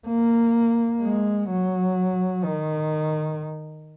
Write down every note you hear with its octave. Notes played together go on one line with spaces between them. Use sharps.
A#3
G#3
F#3
D#3